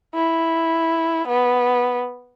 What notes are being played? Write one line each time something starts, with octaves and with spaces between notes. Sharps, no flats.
E4
B3